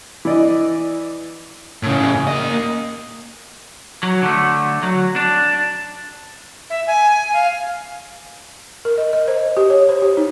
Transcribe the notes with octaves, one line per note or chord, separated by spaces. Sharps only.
E3 D5 D#5
A2 C#3
A#3 D#5
F#3
D3 A3
F#3
D4
E5
G#5
F5
A#4
D#5
D#5
C5
G4
C#5
C5
G4
D#4